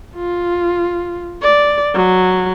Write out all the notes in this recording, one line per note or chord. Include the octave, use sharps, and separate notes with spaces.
F4
D5
F#3